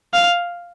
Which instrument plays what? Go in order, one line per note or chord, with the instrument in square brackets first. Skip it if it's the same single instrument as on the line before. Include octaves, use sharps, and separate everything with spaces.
[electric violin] F5